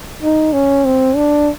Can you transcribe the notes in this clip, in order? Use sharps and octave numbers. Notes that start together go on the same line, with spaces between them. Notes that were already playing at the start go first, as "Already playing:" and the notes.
D#4
C#4
C4
D4